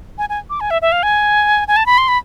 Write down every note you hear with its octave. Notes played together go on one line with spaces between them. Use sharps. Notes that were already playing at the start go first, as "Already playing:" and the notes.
G#5
G#5
D6
G#5
E5
E5
F5
G#5
G#5
A5
B5
C6
B5